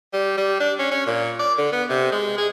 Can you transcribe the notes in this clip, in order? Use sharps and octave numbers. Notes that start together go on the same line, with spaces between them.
G3
G3
D4
C#4
C#4
A#2
D5
D3
B3
C3
G#3
G#4